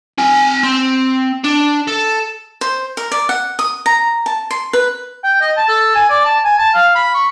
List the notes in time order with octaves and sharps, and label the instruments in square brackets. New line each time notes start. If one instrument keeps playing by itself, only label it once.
[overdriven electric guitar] C4 G#5
C4
D4
A4
[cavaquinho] C5
A#4
D5
F#5
D#6
A#5
A5
C6
B4
[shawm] G5
D#5
A5
A4
G#5
D5
A5
G#5
A5
F5
B5
C#6